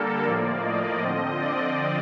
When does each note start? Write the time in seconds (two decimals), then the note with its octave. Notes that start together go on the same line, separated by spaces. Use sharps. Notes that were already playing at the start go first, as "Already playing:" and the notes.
Already playing: D3 G3 A#3 A4 A#4
0.24 A2 F3 A#3 D5
0.62 D#5
1.00 D3 F3 C4
1.39 D5